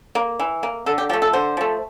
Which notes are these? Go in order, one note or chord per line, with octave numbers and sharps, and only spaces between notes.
A#3
E3
A#3
D3 A4
G4
F3 A3 G4
A4
D3 C5
F3 A3